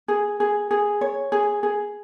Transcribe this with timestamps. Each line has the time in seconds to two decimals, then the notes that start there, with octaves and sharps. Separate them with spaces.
0.08 G#4
0.40 G#4
0.71 G#4
1.01 C#5
1.32 G#4
1.63 G#4